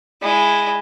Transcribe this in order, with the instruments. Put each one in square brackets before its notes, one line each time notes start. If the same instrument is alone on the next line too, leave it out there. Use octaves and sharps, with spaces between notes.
[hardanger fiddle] G#3 E4